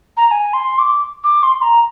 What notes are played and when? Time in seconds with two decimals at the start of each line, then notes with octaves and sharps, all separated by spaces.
0.17 A#5
0.27 A#5
0.31 G#5
0.53 C6
0.79 D6
1.24 D6
1.43 C6
1.62 A#5